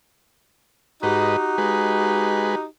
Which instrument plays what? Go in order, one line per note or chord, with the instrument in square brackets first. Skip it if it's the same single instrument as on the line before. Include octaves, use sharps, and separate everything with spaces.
[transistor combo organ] G#2 B4 D#5 [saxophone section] D#4 F#4 G4
[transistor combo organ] G#3 B4